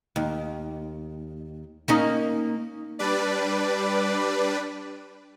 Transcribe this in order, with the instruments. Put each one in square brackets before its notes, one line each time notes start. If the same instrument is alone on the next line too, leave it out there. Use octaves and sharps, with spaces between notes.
[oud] D#2
A#3 C#4 D#4
[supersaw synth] G3 D4 B4 D5